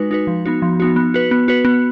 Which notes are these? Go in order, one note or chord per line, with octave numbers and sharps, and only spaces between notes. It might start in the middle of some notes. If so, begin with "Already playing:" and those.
Already playing: G#3 D#4 F#4 B4
D#4 F#4 B4
F3
B3 D#4 F#4
F3
B3 D#4 F#4
B3
F#4 B4
B3
F#4 B4
B3